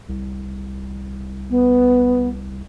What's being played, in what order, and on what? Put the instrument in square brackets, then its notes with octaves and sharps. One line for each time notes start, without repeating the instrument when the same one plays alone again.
[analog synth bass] C2
[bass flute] B3